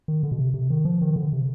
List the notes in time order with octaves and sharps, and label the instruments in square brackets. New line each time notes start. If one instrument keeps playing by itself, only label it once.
[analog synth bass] D#3
D3
B2
C3
C3
D#3
F3
D#3
D3
C3